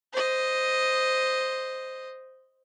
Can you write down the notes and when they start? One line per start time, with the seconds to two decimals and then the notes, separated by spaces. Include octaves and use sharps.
0.13 C5 D#5